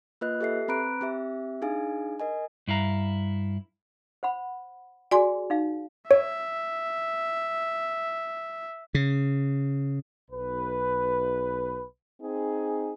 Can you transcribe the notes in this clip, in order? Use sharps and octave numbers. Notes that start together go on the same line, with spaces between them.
A#3 F4 B4 D#5 F#6
G4 A4 E5 C7
C4 B4 A#5 B5 F#6 D7
C4 G4 E5
D4 D#4 G#4 F5 G#5
A#4 D#5 G#5
G2 E4 F5 A#5
C5 F#5 B5
F#4 G#4 D5 G#5 C6
D#4 F5
C#5 E5
C#3
B1 B4
C4 D#4 G#4